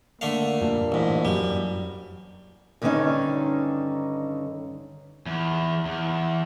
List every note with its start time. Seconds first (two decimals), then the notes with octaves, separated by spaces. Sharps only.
0.21 D3 A3 A#3 F5
0.61 G2 A#2
0.92 A1 G#2
1.25 F#2 G3
2.82 G2 D3 D#3 C4 C#4 D#4
5.26 E2
5.85 E2